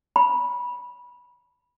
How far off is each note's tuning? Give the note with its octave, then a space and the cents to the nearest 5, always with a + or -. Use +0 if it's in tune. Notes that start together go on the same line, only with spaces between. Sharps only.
B5 -15